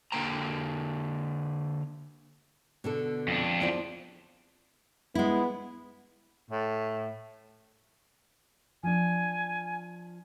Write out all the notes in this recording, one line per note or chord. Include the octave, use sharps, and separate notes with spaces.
D3 A#3 G5 A#5
B2 D3 A4
F2 D4
E2 F3 D5
G#3 B3 E4
A2
F3 D4 G#5